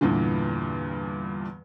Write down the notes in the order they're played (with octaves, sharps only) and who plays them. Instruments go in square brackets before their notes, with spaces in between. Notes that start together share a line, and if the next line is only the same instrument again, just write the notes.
[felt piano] E2 G2 A#2 D3 E3